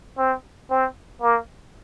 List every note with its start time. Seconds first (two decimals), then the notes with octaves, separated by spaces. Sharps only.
0.18 C4
0.71 C4
1.22 A#3